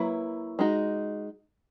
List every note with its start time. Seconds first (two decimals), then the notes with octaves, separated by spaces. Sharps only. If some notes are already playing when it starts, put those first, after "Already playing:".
Already playing: F#3 A#3 E4 B4
0.59 G#3 D#4 F#4